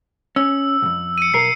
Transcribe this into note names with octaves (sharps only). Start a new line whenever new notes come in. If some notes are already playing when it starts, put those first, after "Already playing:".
C#4 E6
B1 F2
C#7 D#7
B1 A#4 C7